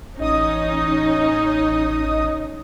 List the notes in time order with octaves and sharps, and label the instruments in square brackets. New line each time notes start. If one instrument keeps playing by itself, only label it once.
[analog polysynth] A1 D#5 D#6 [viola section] C#4 D#4